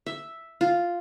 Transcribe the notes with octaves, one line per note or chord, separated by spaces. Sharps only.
E5
F4